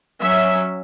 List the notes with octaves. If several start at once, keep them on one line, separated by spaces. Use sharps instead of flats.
F#3 C#4 E5